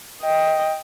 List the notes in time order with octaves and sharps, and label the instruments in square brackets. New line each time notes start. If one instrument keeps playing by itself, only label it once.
[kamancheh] D#5 G5